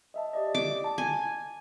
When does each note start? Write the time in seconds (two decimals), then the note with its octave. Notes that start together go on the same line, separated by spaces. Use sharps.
0.14 D#5 E5 A5
0.33 G4 D5 D#5
0.55 D6
0.84 A5
0.98 G#5